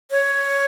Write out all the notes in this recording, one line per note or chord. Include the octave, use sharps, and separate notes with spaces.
C#5